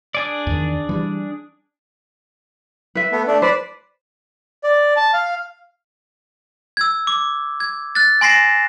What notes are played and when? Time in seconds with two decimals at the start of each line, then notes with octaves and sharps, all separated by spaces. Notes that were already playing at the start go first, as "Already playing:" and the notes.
0.15 D4 G#4 D5
0.47 E2 D#3
0.89 E3 G3
2.95 B4 E5
3.12 A3 B3
3.27 A3 D4
3.42 B4 C5 D5
4.64 D5
4.96 A5
5.13 F5
6.77 E6 G#6
7.07 D6
7.60 G#6
7.95 F#6 A6
8.21 G#5 C6 A#6 C7 E7